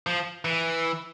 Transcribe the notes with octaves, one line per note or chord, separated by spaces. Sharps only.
F3
E3